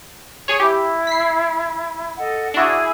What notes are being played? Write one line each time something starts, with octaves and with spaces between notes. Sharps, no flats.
G#4 C#5
E4 G4
B6 C7
A4 D#5 F#5
D4 E4 F#4 G#4